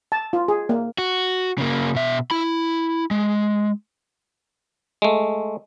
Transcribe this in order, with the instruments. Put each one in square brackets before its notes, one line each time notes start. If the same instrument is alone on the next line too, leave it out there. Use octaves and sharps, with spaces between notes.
[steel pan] A5
F4
G#4
A#3
[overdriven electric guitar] F#4
C#3 A#3
B2 E5
E4 B5
G#3
[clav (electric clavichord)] G#3 A3